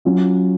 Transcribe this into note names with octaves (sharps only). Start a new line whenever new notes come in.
F#3 C#4 F4